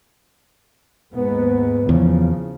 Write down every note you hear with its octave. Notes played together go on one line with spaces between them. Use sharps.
D#2 G#2 B3
E2 C#3 F3